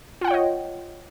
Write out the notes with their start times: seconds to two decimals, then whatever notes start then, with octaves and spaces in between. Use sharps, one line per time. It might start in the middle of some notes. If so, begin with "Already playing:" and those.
0.21 F4
0.24 F#5
0.27 G5
0.31 C#5
0.34 D#5